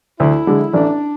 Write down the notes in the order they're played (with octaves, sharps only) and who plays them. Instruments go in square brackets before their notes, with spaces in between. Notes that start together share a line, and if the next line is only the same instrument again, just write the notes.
[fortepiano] D2 [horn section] E4
[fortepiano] D3 G#3
[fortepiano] A1 [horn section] D4